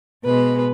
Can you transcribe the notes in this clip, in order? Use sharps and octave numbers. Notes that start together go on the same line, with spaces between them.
B2 G#3 B4